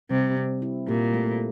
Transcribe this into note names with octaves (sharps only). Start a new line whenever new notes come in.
C3 G3
C4
E4
A#2 G4
A3